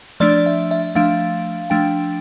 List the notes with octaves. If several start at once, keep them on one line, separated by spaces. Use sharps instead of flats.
F3 A3 D4 D5
E5
E5
F3 A3 D4 F5
F3 A3 D4 G5